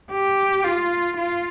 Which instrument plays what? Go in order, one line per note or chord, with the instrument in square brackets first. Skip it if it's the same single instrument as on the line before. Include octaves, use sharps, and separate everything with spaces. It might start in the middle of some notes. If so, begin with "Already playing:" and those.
[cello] G4
F4
F4